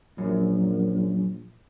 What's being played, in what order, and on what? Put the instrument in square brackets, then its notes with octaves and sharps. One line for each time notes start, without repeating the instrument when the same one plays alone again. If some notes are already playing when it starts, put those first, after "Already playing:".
[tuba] A#1 [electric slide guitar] F#2